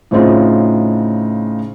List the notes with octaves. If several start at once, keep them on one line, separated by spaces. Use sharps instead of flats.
A2 C#3 C4 D#4 F4